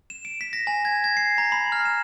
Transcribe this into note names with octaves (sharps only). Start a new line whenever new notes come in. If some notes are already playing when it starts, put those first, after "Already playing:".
E7
D7
B6
A#6
G#5
G#6
G#6
C7
A#5
B5
F6
E7